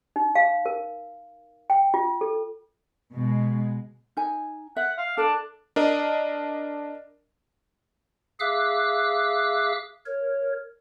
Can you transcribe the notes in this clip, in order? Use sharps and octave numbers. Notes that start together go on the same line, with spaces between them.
D#4
F5
A#4
G5
F4
A4
B2 G#3
D#4 G#5
E5 F#5
F5
D4 A4
D4 A#4 D#5
G#4 E5 F5 D6 E6 F#6
A#4 C#5